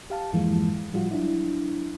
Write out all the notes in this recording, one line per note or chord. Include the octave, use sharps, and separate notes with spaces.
G4 F5 A5
F2 G#2 E3 F3 G#3 A#3
A2 F3 G3 F4 F#4
F#3 D4 E4